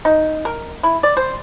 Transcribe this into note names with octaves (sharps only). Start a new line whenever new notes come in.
D#4
A#4
E4
D5
C5